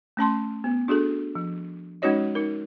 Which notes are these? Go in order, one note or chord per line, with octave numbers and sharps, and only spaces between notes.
A3 C#4 A5 C6
B3
D4 F#4 G#4 A4
F3
G#3 C#4 D#4 F#4 C#5 D#5
D#4 A#4